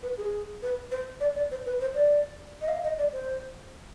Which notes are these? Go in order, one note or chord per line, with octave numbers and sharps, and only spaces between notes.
B4
G#4
B4
C5
D5
D5
C5
B4
C5
D5
D#5
F5
D#5
D5
C5